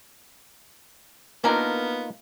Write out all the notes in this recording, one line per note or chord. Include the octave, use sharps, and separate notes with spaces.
A#3 B3 D4 D#4 F4 A#4